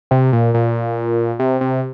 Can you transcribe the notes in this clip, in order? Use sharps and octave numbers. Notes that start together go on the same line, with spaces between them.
C3
A#2
A#2
C3
C3